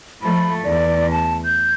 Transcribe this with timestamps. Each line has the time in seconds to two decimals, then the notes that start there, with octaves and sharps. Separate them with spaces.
0.22 F3 A3 B5
0.64 E2 D5
1.11 A5
1.45 G6